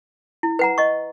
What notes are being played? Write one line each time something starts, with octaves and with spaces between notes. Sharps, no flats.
E4
B4 F#5 A#5
D#5 C#6